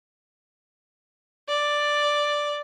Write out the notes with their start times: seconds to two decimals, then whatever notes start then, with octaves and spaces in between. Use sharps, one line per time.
1.48 D5